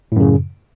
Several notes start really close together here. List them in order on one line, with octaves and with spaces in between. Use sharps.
A2 F#2 C#3